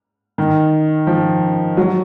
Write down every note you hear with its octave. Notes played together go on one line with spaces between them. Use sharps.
D#3
F3
F#3